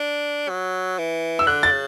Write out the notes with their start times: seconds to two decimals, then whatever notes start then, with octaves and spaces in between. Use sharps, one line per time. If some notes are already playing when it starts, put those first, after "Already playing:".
Already playing: D4
0.49 F#3
0.99 E3
1.39 E6
1.47 D3 F#6
1.63 A6
1.71 C#3